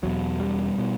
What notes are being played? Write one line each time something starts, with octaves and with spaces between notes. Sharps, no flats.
E2 B2 F#3
G3
B2